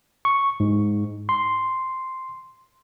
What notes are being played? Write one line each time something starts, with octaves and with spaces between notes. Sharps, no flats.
C#6
G#2
C6